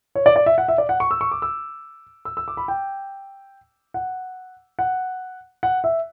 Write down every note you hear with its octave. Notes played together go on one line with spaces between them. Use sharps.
C#5
D5
D5
E5
F#5
E5
D5
F#5
C#6
E6
C#6
D6
E6
E6
E6
D6
B5
G5
F#5
F#5
F#5
E5